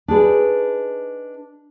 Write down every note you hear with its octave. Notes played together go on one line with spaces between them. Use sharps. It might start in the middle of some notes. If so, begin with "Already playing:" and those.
D4 D#4 G#4 B4